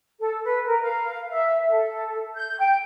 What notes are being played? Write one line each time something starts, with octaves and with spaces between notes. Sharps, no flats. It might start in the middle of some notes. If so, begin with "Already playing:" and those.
A4
B4
A#4
F5
E5
A4
G6
G5